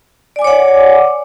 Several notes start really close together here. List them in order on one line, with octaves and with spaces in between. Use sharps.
D5 G#5 D6 C#5 F#5